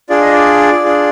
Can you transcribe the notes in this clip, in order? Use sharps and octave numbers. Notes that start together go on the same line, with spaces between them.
D4 F4 G#4 D5
D#5
D5
D4 F4 G#4